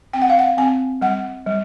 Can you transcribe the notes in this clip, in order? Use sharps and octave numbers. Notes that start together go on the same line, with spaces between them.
C4 G5
F#5
F5
F#5
C4 G#5
G3 F#5
G3